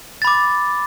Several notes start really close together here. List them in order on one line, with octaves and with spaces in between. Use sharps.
A6 B5 D6